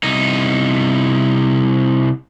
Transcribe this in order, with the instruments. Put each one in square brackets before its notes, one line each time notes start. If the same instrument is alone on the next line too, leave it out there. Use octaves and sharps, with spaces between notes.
[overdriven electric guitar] C2 D#4